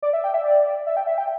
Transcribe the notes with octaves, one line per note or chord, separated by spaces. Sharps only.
D5
E5
G5
E5
D5
E5
G5
E5
G5